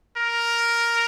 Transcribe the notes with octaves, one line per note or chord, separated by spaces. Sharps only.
A#4